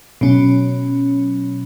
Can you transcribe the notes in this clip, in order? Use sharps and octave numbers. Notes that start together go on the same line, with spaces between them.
B2 F#3 C#4